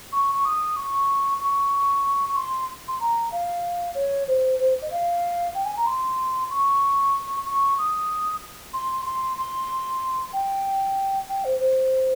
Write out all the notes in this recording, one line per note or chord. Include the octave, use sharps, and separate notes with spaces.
C#6
C#6
D#6
C#6
C#6
C#6
C6
C6
A#5
F5
C#5
C5
C5
D#5
F5
G5
G#5
A#5
C6
C#6
C#6
D#6
C6
C6
C6
G5
G5
C5
C5